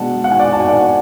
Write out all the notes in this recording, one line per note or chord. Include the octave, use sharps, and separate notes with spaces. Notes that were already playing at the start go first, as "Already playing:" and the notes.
Already playing: B2 G#3 D4 F#5 A5
F#5
G#5
D5 F#5
A5
G#5
D5 F#5